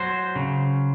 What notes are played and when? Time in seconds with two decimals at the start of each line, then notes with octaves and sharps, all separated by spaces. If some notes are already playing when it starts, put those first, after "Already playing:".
Already playing: F#3 C5
0.36 C#3